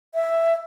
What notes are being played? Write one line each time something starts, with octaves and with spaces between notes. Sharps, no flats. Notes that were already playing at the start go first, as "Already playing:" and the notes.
E5